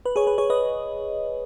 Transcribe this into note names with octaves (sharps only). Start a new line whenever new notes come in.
B4
G#4 C#5
B4
G#4 C#5
B4 D#5